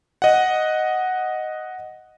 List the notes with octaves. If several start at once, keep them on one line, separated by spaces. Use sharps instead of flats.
D#5 F#5